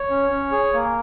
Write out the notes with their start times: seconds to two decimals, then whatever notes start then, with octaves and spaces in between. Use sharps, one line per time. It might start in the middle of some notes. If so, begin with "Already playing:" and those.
Already playing: C#5
0.10 C#4
0.30 C#4
0.52 G#4
0.73 A#3